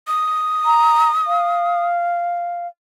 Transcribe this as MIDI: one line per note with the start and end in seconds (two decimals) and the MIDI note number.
0.07 1.85 87
0.66 1.10 82
1.27 2.67 77